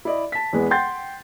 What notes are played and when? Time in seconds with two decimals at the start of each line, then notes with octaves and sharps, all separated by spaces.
0.05 E4 D5 D#5
0.32 A5 B6
0.53 E2 G#3 B3
0.71 F#5 G5 C6 G6 A6